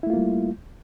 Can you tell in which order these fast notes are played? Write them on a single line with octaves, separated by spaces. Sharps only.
E4 A3 F4 A#3 G3